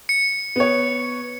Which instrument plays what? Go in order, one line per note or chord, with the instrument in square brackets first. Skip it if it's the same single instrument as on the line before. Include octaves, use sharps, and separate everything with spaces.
[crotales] C#7
[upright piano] B3 C#5